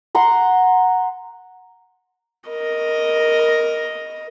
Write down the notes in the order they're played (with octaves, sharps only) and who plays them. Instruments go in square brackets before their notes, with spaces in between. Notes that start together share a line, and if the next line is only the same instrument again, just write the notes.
[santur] F#5 A#5 C6
[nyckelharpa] A#4 D#5